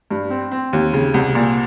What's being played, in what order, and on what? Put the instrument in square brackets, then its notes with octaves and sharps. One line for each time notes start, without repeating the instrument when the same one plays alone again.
[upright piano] G2
C4
C4
D#2
C#3
C2
A#2